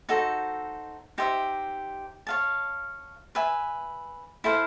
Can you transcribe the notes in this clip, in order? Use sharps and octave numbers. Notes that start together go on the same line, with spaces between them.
D#4 F#4 A4 C5
D#4 G4 C5 E5
C#5 F5 A5
B4 E5 G#5
E4 A4 C5 F5